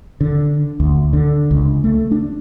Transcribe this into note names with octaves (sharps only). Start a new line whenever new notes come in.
D3
D2
D3
C#2
A3
D4